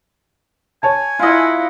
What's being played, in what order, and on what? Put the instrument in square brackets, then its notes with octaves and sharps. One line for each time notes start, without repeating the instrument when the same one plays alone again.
[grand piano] C#5 A5 [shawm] G#5
[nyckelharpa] E4 F#5 [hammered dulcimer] F4 D#5